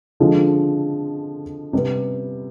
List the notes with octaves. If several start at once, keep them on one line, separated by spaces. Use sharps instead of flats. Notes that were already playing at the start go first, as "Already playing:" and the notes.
D3 F3 G#3 C4
C3 G3 B3